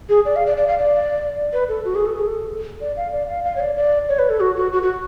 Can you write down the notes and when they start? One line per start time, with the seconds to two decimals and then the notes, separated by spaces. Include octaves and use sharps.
0.09 G#4
0.25 D5
0.36 F5
0.46 D5
0.57 D5
0.68 F5
0.79 D5
1.53 B4
1.69 A4
1.85 F#4
1.95 G#4
2.06 A4
2.17 G#4
2.27 A4
2.81 D5
2.97 F5
3.12 D5
3.28 F5
3.44 F5
3.56 C#5
3.60 D5
3.77 D5
4.09 C#5
4.19 B4
4.30 A4
4.40 F#4
4.56 F#4
4.72 F#4
4.83 F#4